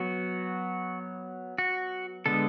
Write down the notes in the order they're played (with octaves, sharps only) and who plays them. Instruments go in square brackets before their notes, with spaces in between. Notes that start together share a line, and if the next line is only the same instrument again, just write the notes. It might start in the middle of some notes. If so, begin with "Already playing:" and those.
Already playing: [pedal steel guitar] F#3 B3 F#4
F#4
D3 G#3 B3 A4